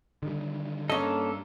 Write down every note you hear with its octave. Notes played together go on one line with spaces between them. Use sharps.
D3 D#3 G3
G2 A#3 C#4 A4 D#5